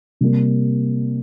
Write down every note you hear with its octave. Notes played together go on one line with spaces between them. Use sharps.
C3 G3 A#3